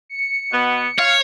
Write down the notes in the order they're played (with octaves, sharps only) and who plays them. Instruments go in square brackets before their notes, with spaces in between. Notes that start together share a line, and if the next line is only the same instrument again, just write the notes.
[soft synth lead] C#7
[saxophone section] B2 B3
[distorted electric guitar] C#5 [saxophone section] F5